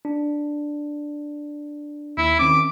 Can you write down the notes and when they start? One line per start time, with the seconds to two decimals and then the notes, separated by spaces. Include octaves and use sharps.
0.05 D4
2.17 D#2 E4
2.39 D#3 C4 C#4 D6